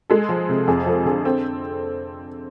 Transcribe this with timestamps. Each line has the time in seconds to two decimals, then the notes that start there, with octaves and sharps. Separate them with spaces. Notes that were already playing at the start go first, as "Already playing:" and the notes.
0.10 G#3 A4
0.29 F3
0.49 C3
0.68 F2 G#4
0.86 F3 A4
1.05 D3 G#4
1.25 C4 A4